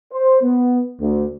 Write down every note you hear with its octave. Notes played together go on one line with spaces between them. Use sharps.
C5
B3
D2